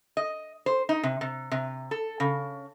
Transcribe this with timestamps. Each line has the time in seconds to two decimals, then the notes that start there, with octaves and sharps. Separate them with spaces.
0.17 D#5
0.66 C5
0.89 D#4
1.03 C3
1.21 C3
1.51 C3
1.91 A4
2.20 C#3